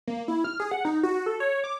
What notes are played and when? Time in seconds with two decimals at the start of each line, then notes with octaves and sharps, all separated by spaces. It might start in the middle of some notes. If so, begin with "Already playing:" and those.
0.07 A#3
0.28 E4
0.44 F6
0.60 G#4
0.71 F#5
0.85 D#4
1.03 F#4
1.26 A4
1.40 C#5
1.64 D6